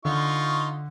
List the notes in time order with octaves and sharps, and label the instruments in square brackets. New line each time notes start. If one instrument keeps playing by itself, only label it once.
[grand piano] D3 [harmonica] D#4 F4 C#6